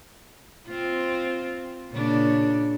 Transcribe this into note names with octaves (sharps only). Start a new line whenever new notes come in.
C4 F4
A#2 C#3 D4